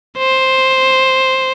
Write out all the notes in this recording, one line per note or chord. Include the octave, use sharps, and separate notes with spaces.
C5